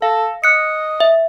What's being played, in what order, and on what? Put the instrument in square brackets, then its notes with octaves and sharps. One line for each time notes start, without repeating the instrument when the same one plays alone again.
[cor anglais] A4 [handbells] F5
[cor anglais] D#5 [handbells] F#6 C#7
[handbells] E5